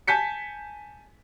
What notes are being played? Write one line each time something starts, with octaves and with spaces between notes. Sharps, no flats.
G#5 A5 G6 B6 C#7